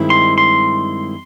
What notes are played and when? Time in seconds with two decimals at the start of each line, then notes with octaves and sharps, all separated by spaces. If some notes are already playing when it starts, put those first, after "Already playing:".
Already playing: G2 D#3 G#3 C4 E4
0.10 C6
0.38 C6